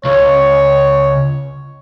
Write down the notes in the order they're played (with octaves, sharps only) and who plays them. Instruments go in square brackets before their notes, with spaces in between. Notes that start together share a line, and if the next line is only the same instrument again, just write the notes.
[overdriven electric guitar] C#2 [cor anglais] C#5